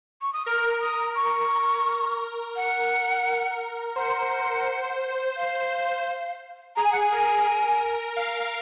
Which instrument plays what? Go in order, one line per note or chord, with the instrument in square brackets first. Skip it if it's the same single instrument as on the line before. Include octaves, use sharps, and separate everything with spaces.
[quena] C#6
D#6
[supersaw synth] A#4 [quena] F6
[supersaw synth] A#4 [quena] D#6
[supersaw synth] A#4 [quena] C#6
[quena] F#5
[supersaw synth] C5 [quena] F#5
[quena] F5
[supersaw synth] G#4 [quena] A#5
[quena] G#5
F#5
G#5
[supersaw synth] A#4
F5